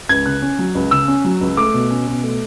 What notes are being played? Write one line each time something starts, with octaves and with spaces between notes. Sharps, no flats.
C#2 G#6
C#3 F#6
C#4
F#3
C#2
C#3 E6
C#4
F#3
C#2
A3 D6
B2
C#4
B2
A3